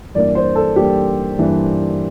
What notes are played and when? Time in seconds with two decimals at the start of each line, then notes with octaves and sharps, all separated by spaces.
0.14 G2 E3 A#3 D4 D5
0.35 C5
0.55 A4
0.76 G2 E3 A#3 D4 G4
1.39 G2 E3 A#3 D4